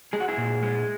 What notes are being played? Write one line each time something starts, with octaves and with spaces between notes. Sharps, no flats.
G#3 G#4
F#4
E4 G#4
A#2
G#3